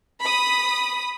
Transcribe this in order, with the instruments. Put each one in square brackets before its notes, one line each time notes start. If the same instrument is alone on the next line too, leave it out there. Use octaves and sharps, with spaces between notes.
[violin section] B5 D#6